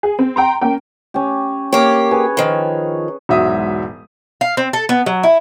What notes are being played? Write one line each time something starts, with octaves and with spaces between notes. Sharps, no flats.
G#4
C4
G5 A#5 C6
A#3 C#4 G5
C#4 G4
A#3 G4 C#5
G#4 B4
D#3 F3
E1 G#2 F#3 E5 D#6
F5
C4
A4
B3
F#3
E4